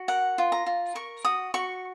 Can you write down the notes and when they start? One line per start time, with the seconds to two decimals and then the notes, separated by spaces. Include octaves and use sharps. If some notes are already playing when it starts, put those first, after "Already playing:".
Already playing: F#4
0.08 A#4 F#5
0.38 F4
0.52 A#5
0.66 F4
0.95 A#4 C#6
1.25 F#4 D#6
1.54 F#4 C#6